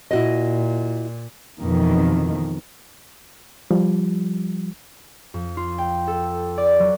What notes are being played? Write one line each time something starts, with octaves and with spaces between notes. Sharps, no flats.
A#2 E4 F#4 D#5
F2 B2 D#3 E3
F3 G3
F2
F4
G5
A4
D5
F#3